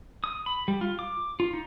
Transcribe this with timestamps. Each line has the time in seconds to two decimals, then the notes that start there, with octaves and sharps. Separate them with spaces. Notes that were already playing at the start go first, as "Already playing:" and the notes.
0.24 D#6
0.46 B5
0.68 G3
0.81 F4
0.99 D6
1.40 F4
1.53 D#4